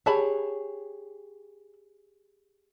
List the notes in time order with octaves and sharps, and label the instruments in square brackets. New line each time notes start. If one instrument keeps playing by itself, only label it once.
[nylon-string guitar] G4 G#4 C#5 [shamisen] E5 A5 B5